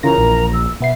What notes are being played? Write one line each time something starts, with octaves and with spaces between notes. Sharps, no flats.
C#3 E3 F4 A#4 A#5 A#6
A#1
E6
B2 B3 E5 C7